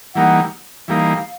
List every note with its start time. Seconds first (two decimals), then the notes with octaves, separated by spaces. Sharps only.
0.15 E3 G3 A#3 D#4 F#5
0.88 E3 G3 A#3 D#4 F5